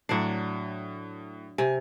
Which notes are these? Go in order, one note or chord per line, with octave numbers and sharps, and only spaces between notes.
A2 F#3 D4 C7
C3 G#5